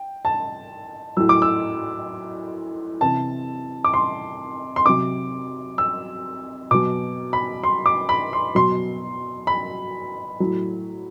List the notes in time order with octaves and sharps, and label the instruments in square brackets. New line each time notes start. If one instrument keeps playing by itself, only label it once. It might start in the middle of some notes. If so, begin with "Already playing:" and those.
Already playing: [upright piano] G5
A5
A2 F#3 E6
D6
E6
C3 E3 A5
D6
C6
C6
C3 F#3 D6
E6
B2 F#3 D6
B5
C6
D6
B5
C6
B2 F#3 C6
B5
A2 F#3